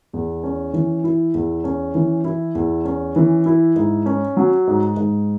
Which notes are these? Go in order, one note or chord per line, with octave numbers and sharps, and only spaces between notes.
E2
C#4
E3
E4
E2
C#4
E3
E4
E2
C#4
E3
E4
G#2
C#4
F#3
G#2
G#2